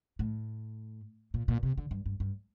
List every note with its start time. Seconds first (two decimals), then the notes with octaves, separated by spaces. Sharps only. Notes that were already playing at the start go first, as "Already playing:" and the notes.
0.19 A2
1.34 A#2
1.48 A#2
1.63 C3
1.78 D3
1.91 G2
2.06 G2
2.20 G2